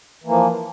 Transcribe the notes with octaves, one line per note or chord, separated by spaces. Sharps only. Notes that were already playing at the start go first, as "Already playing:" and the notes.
E3 F3 A#3